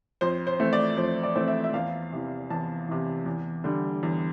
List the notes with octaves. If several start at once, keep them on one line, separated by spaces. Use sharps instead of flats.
F2 C5
C5
E3 A3 C4
D5
F2 C5
D5
E3 A3 C4
E5
E5
E2 F5
C3 E3
E2 A5
C3 E3
E2
D3 G3
E2